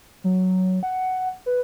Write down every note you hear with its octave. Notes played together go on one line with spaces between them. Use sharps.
F#3
F#5
B4